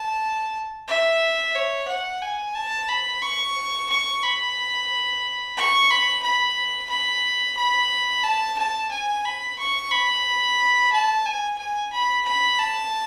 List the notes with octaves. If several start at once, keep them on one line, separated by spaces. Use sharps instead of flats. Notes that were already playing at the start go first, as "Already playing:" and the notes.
Already playing: A5
E5
C#5
F#5
G#5
A5
B5
C#6
C#6
B5
C#6
B5
B5
B5
B5
A5
A5
G#5
B5
C#6
B5
A5
G#5
G#5
B5
B5
A5